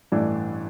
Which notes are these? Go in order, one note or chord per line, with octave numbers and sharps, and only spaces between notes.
A1 G2 E3 A3 D4